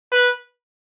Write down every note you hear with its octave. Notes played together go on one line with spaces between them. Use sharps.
B4